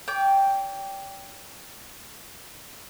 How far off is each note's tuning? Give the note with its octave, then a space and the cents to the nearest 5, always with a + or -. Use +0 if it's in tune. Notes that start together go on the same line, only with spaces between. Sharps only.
C#5 +45 G5 +0 D6 +0